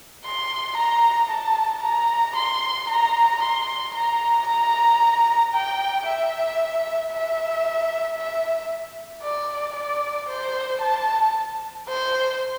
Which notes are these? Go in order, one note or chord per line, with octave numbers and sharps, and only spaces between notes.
C6
A#5
A5
A#5
C6
A#5
C6
A#5
A#5
G5
E5
E5
E5
D5
D5
C5
A5
C5